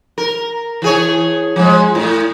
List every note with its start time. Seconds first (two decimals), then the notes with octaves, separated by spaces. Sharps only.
0.18 A#4
0.82 E3 G#4 C#5
1.56 F3 G#3
1.95 A2